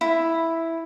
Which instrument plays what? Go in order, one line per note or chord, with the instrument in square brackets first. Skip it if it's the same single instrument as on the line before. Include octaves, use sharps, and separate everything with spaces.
[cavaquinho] E4